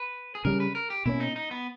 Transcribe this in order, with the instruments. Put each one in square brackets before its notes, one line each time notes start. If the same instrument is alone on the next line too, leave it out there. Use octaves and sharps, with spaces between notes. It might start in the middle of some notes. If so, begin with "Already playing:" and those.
Already playing: [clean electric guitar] B4
G#4
[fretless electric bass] C#3 G3 C#4 [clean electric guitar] A#4
[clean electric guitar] B4
A#4
G4
[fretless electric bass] B2 A#3 C#4 [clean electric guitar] E4
[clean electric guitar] D#4
D#4
B3